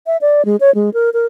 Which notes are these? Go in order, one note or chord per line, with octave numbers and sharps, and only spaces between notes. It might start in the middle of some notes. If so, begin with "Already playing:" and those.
E5
D5
G#3
C#5
G#3
A#4
A#4